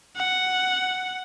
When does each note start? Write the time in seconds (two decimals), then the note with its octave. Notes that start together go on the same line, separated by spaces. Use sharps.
0.17 F#5